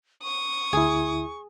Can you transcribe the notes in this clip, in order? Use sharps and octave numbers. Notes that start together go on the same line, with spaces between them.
C#6 D#6
D2 E4 G#4